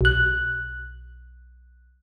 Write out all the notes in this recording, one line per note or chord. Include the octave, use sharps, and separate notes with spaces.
B1 F#6